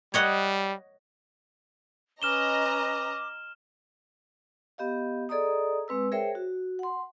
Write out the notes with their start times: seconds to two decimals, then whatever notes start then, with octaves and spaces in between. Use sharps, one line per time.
0.14 G3 C#5 D#5 F#5
2.22 C#4 B4 D#5 A#5 D6 F6 E7 G7
4.78 B3 G4 D#5 F5
5.29 G#4 A4 D5 D#5 A#5 D#6
5.88 G#3 C4 B4 E6
6.12 G#4 A#4 C5 C#5 E5 G5
6.35 F#4
6.79 F#5 C6